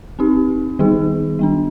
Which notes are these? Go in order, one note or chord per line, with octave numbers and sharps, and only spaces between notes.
C4 D#4 G4
D#3 G3 B3 D#4 G#4
G3 B3 D4